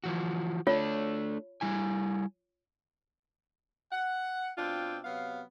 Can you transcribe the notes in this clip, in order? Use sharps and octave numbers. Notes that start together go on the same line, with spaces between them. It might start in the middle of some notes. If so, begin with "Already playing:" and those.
E3 F3 F#4
A3 D4 F4 C#5
G3 E4 G#5
F#5
B2 C4 D4 F4 G5
C3 F#3 B3 F5